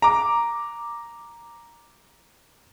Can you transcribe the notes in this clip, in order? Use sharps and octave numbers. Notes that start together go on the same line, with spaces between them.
A#5 D6